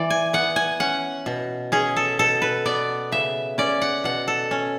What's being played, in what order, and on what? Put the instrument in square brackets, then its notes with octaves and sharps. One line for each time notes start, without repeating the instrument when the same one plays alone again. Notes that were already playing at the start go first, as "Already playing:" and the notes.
Already playing: [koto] E3 D5
G#5
B3 F#5
G#5
C#4 F#5
B2
C#4 G#4
A4
B2 A4
B4
B3 D5
C#3 E5
C#4 D5
F#5
B2 F#5
A4
C#4